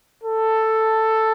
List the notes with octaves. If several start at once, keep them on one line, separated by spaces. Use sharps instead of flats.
A4